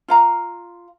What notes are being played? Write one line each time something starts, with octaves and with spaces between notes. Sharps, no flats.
F4 F5 A#5